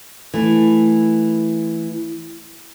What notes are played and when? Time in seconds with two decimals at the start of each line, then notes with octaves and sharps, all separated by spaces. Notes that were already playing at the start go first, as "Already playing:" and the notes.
0.34 E3 A3